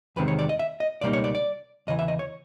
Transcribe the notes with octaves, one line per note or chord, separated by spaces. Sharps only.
E2 C3 D#3 G#3 C4 B4
C#5
D5
D#5
E5
D#5
C#2 B2 G3 A#3 D#4 D5
C#5
D5
D5
E2 C#3 E3 D#5
E5
D#5
C#5